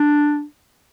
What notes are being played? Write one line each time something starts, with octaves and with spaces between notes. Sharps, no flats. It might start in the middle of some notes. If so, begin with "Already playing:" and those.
Already playing: D4